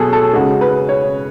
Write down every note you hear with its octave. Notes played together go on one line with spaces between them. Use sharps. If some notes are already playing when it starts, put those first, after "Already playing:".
Already playing: B2 F#3 G#4 A4
A4
C#3 G#3 F#4
B4
C#5